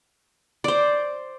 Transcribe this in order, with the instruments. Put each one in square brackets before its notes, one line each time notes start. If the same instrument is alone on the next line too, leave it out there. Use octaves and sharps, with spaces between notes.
[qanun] C5 D5